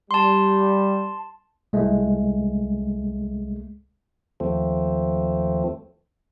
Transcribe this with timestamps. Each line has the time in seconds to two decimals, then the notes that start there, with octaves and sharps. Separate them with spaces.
0.11 G3 A5 C6
1.73 C2 G#3 A3
4.40 D#2 F3 A3 C4